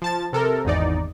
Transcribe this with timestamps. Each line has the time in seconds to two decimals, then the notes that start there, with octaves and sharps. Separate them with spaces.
0.02 F3 A5 A6
0.33 C3 A4 A#4
0.65 G#1 E2 D#4 D5